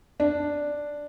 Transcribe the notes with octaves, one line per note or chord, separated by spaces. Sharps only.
D4